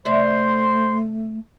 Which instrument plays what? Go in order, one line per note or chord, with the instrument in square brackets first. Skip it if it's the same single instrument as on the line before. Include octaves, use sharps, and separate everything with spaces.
[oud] C3 D5 E5 [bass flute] A3 [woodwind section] C5 C6